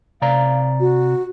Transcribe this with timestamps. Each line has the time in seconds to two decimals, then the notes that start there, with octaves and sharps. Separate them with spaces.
0.22 C3 D5 F5 A#5
0.80 F#4